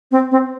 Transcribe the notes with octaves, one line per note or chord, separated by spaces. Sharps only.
C4
C4